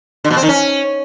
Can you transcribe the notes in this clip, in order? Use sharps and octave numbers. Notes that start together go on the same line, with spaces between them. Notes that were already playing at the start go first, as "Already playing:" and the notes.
D3
B2
C4
D#3
C#4